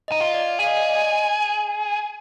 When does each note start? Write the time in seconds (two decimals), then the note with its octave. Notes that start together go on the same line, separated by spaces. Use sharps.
0.08 D#4 D#5
0.20 F4
0.34 D5
0.59 G#4 F5
0.67 D#5
0.76 D5
0.83 D#5